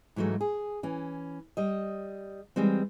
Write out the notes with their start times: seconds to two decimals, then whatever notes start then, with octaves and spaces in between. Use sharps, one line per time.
0.16 G#2 E3 F#3 G#3 A3
0.41 G#4
0.83 E3 C#4
1.57 G3 D#5
2.56 E3 G3 G#3 C4